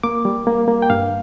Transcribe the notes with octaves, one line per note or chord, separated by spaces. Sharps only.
A#3 D6
G3
A#3
A#3
G5
G2 F5